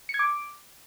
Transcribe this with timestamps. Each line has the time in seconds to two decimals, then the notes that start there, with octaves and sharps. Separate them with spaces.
0.09 C#7
0.14 G#6
0.19 D6